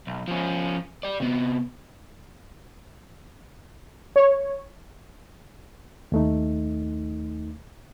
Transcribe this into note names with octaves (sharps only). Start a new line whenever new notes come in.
B1
F3 C#4
D5 G5
C3 B3
C#5
D#2 A3 D#4